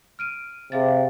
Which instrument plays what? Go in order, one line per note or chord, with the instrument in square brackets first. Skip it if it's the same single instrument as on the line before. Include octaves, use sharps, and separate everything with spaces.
[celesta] F6 D7 D#7
[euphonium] C3 [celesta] G#4 F5 A6